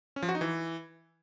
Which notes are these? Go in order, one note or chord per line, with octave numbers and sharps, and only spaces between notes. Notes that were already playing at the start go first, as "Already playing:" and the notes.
C#4
F3
F#4
D#4
E3